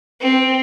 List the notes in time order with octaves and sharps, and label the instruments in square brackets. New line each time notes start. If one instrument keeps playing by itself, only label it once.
[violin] C4